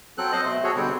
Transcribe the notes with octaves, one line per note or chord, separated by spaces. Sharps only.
F#3 C4 A4 F#6
C5 D#5
B2 A3
F#4 G#4 A4 C#5
B2 D3 G3 C4